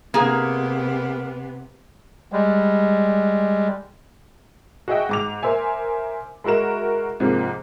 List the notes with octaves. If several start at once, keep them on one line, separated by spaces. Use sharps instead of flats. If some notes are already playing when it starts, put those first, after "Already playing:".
C3 A#3 B3 G#4
G3 G#3
F#4 G#4 D#5 E5 G5
G#2 D6 F7
A#4 C5 E5 G#5
G#3 E4 F#4 A#4 E7
G#2 C3 F3 A#3